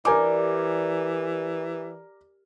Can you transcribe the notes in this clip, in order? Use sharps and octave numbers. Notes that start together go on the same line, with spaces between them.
E3 G3 A#4 G#5 D6